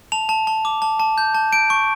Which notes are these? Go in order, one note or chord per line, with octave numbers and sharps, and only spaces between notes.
A5 F7
A5
A5
D6
A5
A5
G6
A5
G6 D7
C#6